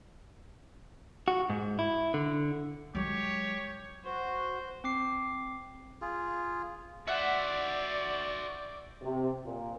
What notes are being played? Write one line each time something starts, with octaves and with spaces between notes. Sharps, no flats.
F#4
G#2
E4
D3
F#3 G#3 G4 C#5
F#4 C5
C4 D6 C7
F4 G#4
F#4 C5 D5 E5 F#5
C3
A#2